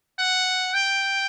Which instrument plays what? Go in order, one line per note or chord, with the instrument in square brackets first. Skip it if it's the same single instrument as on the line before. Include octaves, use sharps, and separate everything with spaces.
[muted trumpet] F#5
G5